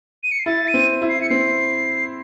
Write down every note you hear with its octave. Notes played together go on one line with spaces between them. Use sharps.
D#7
C#7
C7
E4 A6
D#7
C4
E4
C7
C#7
C4 C7